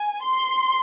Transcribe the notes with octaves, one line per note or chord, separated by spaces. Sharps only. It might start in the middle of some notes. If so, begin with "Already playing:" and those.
Already playing: G#5
C6